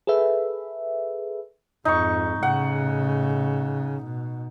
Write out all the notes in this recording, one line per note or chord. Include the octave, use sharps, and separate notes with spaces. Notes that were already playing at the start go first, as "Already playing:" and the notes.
G#4 A4 B4 E5
F2 G#2 D#4 C#6
A2 C#3 F#5
B2